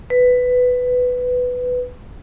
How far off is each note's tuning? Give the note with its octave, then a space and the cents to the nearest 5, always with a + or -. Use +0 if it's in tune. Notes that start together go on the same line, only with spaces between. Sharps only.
B4 +10